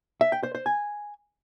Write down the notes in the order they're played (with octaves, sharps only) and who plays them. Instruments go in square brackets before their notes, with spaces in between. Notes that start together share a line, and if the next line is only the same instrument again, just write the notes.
[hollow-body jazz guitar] E5
G5
C5
C5
G#5